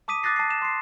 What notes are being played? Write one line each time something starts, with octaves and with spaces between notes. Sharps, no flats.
A5 D6 D#6 B6 D#7
D6 D#6 F#6 A6 A#6 C7
A5 C7
E7
C6 C7